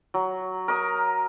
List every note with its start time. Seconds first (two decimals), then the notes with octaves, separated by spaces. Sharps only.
0.14 F#3
0.68 A#4 D#6